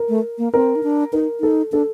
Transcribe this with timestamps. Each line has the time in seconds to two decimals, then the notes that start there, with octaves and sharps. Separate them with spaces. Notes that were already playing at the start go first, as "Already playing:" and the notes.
Already playing: A#4
0.09 A3
0.38 A#3
0.54 C4 A#4
0.75 D#4
0.83 D4
1.13 D#4 A#4
1.40 D#4 A4
1.72 D4 A4